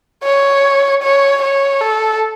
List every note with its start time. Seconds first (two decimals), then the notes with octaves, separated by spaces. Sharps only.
0.24 C#5
1.03 C#5
1.42 C#5
1.81 A4